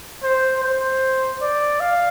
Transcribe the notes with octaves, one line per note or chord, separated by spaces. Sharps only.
C5
C5
D5
F5